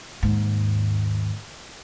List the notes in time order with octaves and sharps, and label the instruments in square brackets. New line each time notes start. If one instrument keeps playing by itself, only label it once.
[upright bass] D#2 G#2